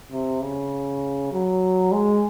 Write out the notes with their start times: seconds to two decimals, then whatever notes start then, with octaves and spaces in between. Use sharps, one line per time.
0.12 C3
0.42 C#3
1.32 F#3
1.92 G#3